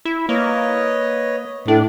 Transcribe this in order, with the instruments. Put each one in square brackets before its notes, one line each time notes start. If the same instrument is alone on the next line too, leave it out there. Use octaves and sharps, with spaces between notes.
[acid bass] E4
[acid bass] A#3 [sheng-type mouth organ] B4 C#5 D#5
[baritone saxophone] A2 [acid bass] D4